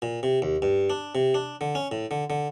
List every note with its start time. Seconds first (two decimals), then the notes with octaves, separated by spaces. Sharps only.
0.02 A#2
0.23 C3
0.42 D#2
0.62 G2
0.90 D4
1.15 C3
1.34 D4
1.61 D3
1.75 C#4
1.92 A2
2.11 D3
2.30 D3